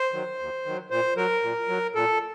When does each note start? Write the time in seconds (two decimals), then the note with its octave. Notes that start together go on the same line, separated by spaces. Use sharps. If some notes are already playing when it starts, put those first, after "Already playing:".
Already playing: C5
0.12 D#3 F#3
0.39 D#2
0.65 D#3 F#3
0.90 A#2 C5
1.16 F#3 A#4
1.43 A#2
1.68 F#3
1.95 A#2 A4